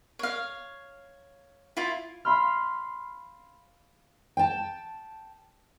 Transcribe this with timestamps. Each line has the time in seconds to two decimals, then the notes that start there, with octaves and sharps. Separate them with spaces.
0.19 C#5 F5
1.77 E4 F4
2.25 F5 B5 C6 F6
4.37 G5 A5